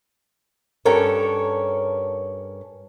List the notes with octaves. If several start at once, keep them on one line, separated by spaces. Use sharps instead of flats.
G2 C#4 A4 A#4 C#5